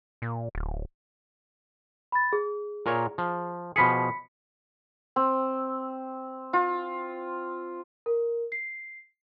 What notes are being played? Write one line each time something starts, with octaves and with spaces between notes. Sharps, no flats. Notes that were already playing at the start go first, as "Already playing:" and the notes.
A#2
D1
B5 A6
G#4
A#2 A#4 C#5
F3
B2 F3 G#4 B5 B6 C#7
C4
F4
A#4
C7